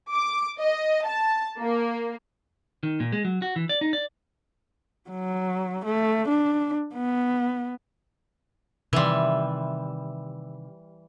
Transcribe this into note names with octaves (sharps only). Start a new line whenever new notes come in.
D6
D#5
A5
A#3
D#3
A#2
G#3
F#3
F#4
E3
D5
D#4
D5
F#3
A3
D4
B3
C3 D#3 E3 G3 E5 C6